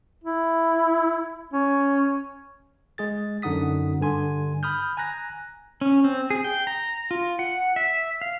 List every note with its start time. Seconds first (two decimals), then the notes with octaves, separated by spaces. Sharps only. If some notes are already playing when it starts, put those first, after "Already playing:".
0.24 E4
1.53 C#4
2.98 G#3 G#4 A6
3.42 F#2 D3 D#4 F#5 D#6 B6
4.00 G2 D3 G#5 C6
4.63 B5 D#6 F6 G6
4.97 G#5 A#5 F#6 A#6
5.81 C#4
6.04 C4
6.30 G#4
6.44 G5
6.67 A#5
7.11 F4
7.39 F#5
7.76 E5
8.21 F5